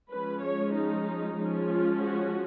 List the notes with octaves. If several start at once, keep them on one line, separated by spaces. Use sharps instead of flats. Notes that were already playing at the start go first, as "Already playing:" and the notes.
F3 G#3 C#4 B4
C#5
D#4
F3 G#3 C#4
F4
F#4